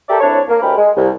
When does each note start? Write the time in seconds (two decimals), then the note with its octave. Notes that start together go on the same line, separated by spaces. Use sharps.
0.09 G4 A4 A#4 D5 E5 G5
0.20 C2 D4 E4 C#5
0.48 A#3
0.62 D2 A2 G#3 G4 A#4 B5
0.77 G#3
0.96 C2